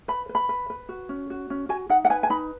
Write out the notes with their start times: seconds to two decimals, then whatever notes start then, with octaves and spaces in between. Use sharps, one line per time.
0.08 B4 B5
0.29 B4
0.35 B5
0.49 B4
0.70 B4
0.89 F#4
1.09 C#4
1.30 F#4
1.50 C#4
1.69 F#4 G#5
1.90 D#4 F#5
2.05 F#5
2.10 B4 G#5
2.23 G#5
2.30 D#4 B5